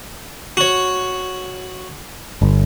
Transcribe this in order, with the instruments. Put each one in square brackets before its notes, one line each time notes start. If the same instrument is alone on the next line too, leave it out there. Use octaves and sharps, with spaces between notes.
[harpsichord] F#4 C#5
[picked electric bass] G1